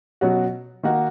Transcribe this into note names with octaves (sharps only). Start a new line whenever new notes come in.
B2 F#3 C#4 F#4
D#3 A#3 D#4 F#4